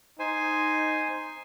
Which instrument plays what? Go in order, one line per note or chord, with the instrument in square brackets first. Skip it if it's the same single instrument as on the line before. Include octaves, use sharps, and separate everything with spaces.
[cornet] D#4 [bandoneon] C5 G#5